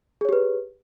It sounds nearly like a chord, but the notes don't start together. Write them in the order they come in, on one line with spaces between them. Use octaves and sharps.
G#4 C#5 G4 B4